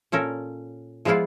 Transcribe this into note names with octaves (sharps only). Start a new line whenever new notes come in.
A#2 C#4 A4 A#4
F3 G#3 B3 E4 F4 D5